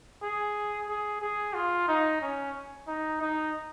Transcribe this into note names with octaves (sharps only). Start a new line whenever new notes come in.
G#4
G#4
G#4
F4
D#4
C#4
D#4
D#4